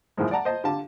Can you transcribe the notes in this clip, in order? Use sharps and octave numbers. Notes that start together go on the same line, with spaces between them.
F#2 A2 D#3 F3 G#3
D5 F#5 A5 A#5
C5 D#5 A5
D3 F4 G4 A5